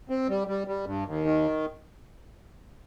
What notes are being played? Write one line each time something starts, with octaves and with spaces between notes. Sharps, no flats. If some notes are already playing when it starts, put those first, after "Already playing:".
C4
G3
G3
G3
G2
D#2
D#3